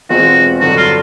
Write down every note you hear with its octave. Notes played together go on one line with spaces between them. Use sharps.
E2 B2 G#3 C4 F4 F#4
G2 D3 F#3 F#4
F4